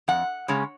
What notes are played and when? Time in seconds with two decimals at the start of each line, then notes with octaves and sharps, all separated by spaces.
0.08 F2 F#5
0.48 C#3 G#3 C#4